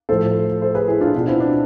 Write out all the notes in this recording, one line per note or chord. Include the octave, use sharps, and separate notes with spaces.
A2 F3 A4 C5
A4 C5
G#4 B4
E4 G#4
D4 F4
B2 D4 F4
C4 E4
D4